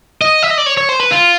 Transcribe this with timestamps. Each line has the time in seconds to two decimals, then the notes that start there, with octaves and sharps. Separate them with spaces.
0.21 D#5
0.43 E5
0.50 D#5
0.58 D5
0.66 C#5
0.78 C#5
0.89 C5
1.00 B4
1.11 F4